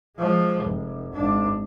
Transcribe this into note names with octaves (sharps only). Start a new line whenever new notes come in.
F3 G#3
F1
G#1 D4